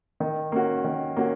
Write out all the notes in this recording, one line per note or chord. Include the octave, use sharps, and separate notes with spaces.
D#3
A#3 C#4 F#4
D#3
A#3 C#4 F#4